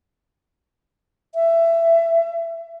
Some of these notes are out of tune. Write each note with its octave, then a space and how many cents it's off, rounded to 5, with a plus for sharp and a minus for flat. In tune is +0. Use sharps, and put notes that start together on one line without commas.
E5 +20